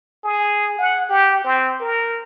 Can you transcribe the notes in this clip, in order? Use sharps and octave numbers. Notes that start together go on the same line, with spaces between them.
G#4
F#5
G4
C4
A#4